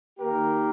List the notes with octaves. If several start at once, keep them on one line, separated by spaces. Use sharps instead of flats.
D#3 A#3 G4 A#4